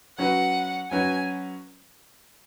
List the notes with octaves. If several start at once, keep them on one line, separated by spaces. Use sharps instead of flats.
F#3 C#4 F#4 B4 F#5
F#3 C#4 F#4 B4 G#5